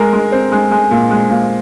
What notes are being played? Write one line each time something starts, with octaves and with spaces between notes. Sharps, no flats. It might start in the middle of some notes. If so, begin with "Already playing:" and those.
Already playing: G#3 A#4
G#3
C4
G#3
G#3
A#2
G#3
A#2